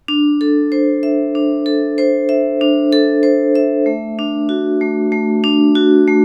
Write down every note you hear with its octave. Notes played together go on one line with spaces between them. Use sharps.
D4
A4
C5
E5
D4
A4
C5
E5
D4
A4
C5
E5
A3
D4
F#4
A3
A3
D4
F#4
A3